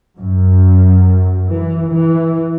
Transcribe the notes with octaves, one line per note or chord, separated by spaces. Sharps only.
F#2
E3
E3